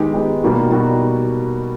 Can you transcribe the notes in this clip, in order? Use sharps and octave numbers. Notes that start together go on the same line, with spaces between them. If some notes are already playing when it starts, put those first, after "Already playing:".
Already playing: D#3 G#3 B3 D#4 G4
D#3 G#3 B3 D#4 G4
B2 G3 A#3 D#4 F#4
B2 G3 A#3 D#4 F#4